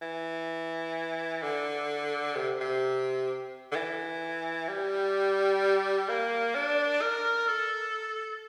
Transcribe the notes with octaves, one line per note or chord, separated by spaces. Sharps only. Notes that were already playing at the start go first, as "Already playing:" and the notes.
E3
D3
C3
C3
D3
E3
G3
A#3
D4
A#4
A4